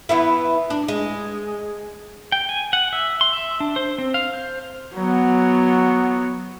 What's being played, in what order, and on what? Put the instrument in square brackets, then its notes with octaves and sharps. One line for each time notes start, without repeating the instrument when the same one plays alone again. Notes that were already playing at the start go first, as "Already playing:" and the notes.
[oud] E3 B3 E4
D4
G#3
[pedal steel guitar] G5
G#5
F#5
E5
C6
E5
D4
C5
C4
F5
C5
[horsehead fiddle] F#3 B3